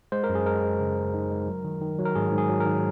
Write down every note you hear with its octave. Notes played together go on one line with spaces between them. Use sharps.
G#3 C5
A#4
F#2
G#4
G#3 A#4
G#3
C#3
G#3
D#4
G#3
F#3
D#3
D#3
F#3
A#4
G#2 G#4
G#2
G#4
F#3
A#4
D#3